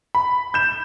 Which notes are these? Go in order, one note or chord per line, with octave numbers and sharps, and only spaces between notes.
B5
G6 E7